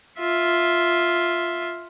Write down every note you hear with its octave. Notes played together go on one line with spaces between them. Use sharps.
F4 E5